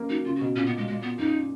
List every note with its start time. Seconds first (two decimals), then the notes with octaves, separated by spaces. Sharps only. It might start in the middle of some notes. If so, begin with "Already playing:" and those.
Already playing: A#3 C#4
0.09 F#3 D#4
0.25 C#3 F4
0.36 F#4
0.41 B2
0.56 A#2 C#4
0.66 B3
0.77 G#3
0.87 G#3
1.03 B3
1.19 F#2 D#4